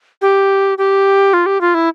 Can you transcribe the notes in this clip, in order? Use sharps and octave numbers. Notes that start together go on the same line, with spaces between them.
G4
G4
F4
G4
F4
E4